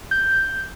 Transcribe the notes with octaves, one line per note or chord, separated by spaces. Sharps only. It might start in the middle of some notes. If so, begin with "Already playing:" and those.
G6